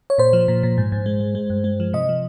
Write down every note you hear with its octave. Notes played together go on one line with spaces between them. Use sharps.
C#5
A#2 C5
F3
A#2
A#2
G#2
G#2
G#3
G#3
G#3
G2
G#3
F3
C3 D#5
F3